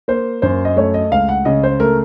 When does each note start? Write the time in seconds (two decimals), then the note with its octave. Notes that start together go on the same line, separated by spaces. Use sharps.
0.08 A#3 C5
0.42 F#2 C5
0.65 D#5
0.76 A3 C#5
0.94 D#5
1.11 C#2 F5
1.29 F#5
1.45 C#3 D#5
1.63 C5
1.80 A3 A#4